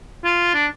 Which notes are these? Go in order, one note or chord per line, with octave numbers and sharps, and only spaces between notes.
F4
D4